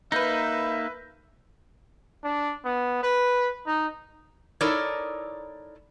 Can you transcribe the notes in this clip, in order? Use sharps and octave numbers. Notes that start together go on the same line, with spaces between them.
A#3 D#4 B4 E5 G6 A#6
D4
B3
B4
D#4
D#4 E4 A4 A#4 C#5 D5